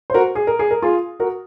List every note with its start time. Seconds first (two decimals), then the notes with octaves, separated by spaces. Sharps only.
0.10 C5
0.14 F#4 A#4
0.35 G#4
0.47 A#4
0.59 G#4
0.71 A#4
0.82 F4 G#4
1.20 F#4 A#4